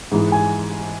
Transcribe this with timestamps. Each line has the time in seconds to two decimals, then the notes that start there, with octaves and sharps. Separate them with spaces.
0.11 G#2 E3 G#3
0.32 G#5